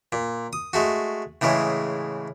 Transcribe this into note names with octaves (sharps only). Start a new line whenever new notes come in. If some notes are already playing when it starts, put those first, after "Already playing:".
A#2
D#6
G#3 A3 F#4
A2 C#3 E3 G#3